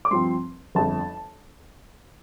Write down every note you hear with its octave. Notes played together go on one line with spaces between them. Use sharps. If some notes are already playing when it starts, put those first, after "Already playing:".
D6
G2 F3 C4 C6
G1 F2 F3 A5